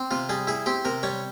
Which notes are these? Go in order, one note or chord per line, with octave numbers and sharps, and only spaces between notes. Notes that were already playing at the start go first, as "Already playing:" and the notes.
Already playing: C4
C3 F4
G3 G#4
E4 G#4
C4 G4
C3 A#4
G3 C#5